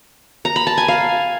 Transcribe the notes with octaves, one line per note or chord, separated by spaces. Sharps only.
A#5
B5
A5
G#5
F5